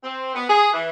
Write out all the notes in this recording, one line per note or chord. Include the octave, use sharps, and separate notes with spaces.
C4
B3
G#4
E3